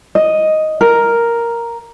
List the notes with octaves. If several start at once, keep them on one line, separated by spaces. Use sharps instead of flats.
D#5
A#4